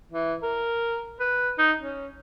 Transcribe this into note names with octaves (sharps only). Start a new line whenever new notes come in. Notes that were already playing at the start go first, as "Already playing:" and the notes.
E3
A#4
B4
D#4
C#4